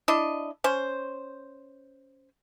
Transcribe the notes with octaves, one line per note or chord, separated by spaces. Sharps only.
D4 E4 D#5
C#4 C5